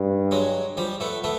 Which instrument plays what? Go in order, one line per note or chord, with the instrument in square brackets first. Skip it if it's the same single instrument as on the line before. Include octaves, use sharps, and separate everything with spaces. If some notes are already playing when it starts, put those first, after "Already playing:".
Already playing: [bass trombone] G2
[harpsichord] F#3 G#3
F3 G3
A3 B3
A3 B3